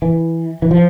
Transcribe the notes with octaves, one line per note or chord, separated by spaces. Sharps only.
E3
E3
F3